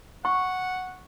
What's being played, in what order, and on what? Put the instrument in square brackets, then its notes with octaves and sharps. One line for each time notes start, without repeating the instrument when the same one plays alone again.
[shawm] F#5 [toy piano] C#6